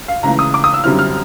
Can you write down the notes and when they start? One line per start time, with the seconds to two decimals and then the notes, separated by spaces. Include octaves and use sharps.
0.08 F5
0.23 C#2 C#3 E3 A3 A#5
0.39 D#6
0.54 D6
0.64 D#6
0.74 E6
0.84 F#2 D3 G3 C4 E4 F6
0.99 F6